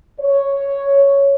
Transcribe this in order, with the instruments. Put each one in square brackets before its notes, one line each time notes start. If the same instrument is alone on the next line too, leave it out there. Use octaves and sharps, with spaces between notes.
[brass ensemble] C#5